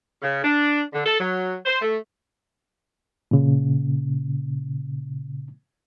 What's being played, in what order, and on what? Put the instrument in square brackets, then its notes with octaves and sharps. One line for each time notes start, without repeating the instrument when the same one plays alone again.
[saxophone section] C#3
D4
D3
A4
F#3
C5
A3
[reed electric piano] A#2 C#3